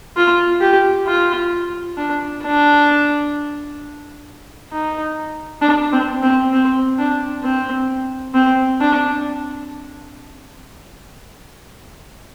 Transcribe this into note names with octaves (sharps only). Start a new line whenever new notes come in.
F4
G4
F4
D4
D4
D#4
D4
C4
C4
C4
D4
C4
C4
D4